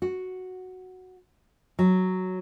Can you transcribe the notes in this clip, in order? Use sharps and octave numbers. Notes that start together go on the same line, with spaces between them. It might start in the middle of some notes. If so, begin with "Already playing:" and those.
F#4
F#3